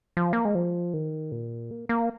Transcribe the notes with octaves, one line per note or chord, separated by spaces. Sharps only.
F3
A#3
G#3
F3
D#3
A#2
A#3
A#3